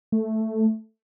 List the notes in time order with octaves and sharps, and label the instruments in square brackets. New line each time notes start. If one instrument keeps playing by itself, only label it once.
[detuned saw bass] A3